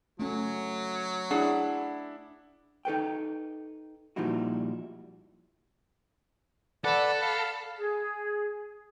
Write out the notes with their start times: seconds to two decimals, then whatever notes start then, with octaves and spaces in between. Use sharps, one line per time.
0.19 F#3 A3 C#4
1.31 D4 E4 G#4 F#5
2.85 D#4 A4 B4 G5
4.16 A#2 F3 G3 D#4 E4 F#4
6.85 A4 B4 D5 F#5
7.21 F5 B5
7.79 G#4